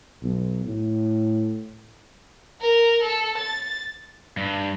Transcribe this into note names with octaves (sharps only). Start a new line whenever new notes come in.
B1
A2
A#4
A4
A6
G2